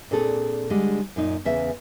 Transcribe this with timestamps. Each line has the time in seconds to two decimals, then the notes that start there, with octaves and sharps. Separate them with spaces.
0.11 A#2 C4 D4 G#4 A4
0.70 D3 G3 G#3 D4
1.16 F#2 A#2 D#4
1.45 E2 C#3 E5